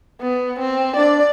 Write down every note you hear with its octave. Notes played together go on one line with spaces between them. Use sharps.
B3
C4
D4 D5